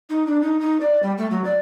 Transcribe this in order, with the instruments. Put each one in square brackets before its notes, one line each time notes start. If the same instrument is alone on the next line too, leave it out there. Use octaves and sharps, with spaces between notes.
[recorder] D#4
D4
D#4
D#4
D5
G3
A3
F#3
D5